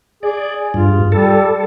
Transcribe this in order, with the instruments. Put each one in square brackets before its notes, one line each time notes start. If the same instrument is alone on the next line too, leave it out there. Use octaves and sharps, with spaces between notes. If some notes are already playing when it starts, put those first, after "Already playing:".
[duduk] G#4 [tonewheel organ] D5
[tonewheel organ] G2 [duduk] F4
[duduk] G3 [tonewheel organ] A4